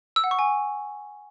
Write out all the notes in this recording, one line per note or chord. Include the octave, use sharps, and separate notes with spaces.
E6
F#5
C#6
G#5